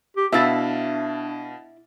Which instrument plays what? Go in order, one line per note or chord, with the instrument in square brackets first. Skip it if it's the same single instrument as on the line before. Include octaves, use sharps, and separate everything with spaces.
[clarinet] G4
[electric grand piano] B2 F5 A6 [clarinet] D4 [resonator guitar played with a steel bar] E4 E5